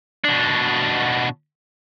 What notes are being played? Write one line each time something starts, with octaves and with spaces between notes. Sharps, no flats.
B2 D4